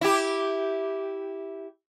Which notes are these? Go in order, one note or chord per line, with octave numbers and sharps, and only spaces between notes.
E4 G4